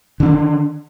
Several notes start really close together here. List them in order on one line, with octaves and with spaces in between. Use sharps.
D3 D4 D#3